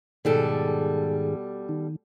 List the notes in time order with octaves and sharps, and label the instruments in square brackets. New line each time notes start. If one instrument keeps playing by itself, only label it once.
[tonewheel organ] G#2 D#3 G#4 [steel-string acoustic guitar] B2 G3 A4
[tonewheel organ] D#3